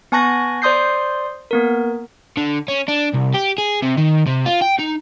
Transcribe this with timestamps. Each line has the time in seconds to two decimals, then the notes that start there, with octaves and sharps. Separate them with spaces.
0.12 B3 G#5 A5 C#6 F#6 A#6
0.62 C5 D5 C6 D#6 G6 C7
1.51 A#3 B3 A#4
2.37 D3
2.68 C#4
2.88 D4
3.14 C2
3.34 G4
3.58 G#4
3.82 C3
3.97 D#3
4.27 C3
4.46 F4
4.62 G5
4.79 D#4